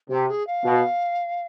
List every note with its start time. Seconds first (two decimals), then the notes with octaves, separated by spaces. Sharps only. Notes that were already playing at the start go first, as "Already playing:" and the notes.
0.09 C3 G4
0.29 G#4
0.47 F5
0.65 B2